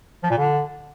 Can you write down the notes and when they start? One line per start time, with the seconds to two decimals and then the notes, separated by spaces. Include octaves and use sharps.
0.23 F3
0.30 A#2
0.37 D3